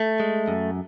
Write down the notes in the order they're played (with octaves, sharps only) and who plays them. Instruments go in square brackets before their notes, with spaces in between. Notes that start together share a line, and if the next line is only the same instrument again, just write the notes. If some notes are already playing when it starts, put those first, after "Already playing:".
Already playing: [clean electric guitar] A3
G#3
F#2